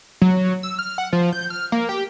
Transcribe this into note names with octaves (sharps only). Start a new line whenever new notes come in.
F#3
E6
F6
F#5
F3
G6
F6
A#3
G4